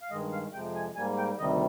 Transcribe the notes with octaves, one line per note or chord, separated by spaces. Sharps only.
F5
G2 D#3 G#3 D#5
F5
F2 C3 F3 G#3 G5
G#5
G#2 G3 A#3 G#5
G5
D2 C3 D#3 G3 D#5